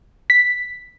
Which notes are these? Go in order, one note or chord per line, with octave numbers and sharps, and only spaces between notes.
B6